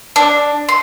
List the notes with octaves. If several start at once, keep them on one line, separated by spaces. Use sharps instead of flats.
D4
C6